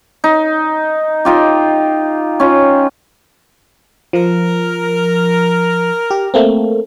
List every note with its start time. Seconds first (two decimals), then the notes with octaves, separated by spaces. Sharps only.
0.24 D#4
1.25 D#4 F4 G4
2.40 C#4 F4
4.13 F3 A#4
6.11 G4
6.34 A3 A#3 C4